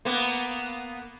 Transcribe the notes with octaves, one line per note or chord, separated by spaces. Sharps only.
A#3 B3